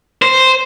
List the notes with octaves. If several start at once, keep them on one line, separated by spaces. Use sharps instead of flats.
C5